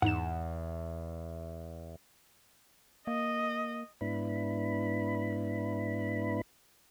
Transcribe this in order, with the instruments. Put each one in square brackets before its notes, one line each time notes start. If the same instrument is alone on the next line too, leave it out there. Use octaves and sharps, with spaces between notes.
[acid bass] E2 [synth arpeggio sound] G#2 D#4 E7 [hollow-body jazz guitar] F#5
[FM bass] A#3 [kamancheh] D#5
[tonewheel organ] G#2 B3 D4 E4 B5